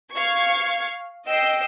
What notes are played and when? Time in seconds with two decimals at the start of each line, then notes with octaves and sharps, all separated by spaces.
0.13 F5 C#6 G#6 C#7
1.27 D#5 G5 E6 C7